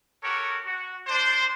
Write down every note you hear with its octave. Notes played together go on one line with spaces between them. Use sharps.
F#4 G4 A4 A#4 C#5
F#4
D4 C5